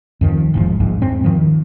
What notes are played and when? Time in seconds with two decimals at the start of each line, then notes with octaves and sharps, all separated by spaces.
0.21 F2 D#3 F3
0.54 E1 G#2 F3
0.80 A#1 G#2
1.02 E2 G#2 C4
1.24 D#3 F3